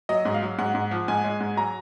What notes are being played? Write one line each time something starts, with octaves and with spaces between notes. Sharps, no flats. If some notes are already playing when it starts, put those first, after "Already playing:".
F#3 D#5
G#2
F5
F#3
G#2 F#5
G#2
F3
G#2 G#5
G#3
G#2
F#3 A#5